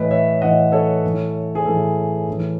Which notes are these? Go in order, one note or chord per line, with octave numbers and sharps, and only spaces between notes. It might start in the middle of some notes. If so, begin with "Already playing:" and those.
Already playing: A2 E3 B4 D#5
C#5 E5
A2 E3 D#5 F#5
A4 C#5
A2 E3
G#4
A2 E3 A4
A2 E3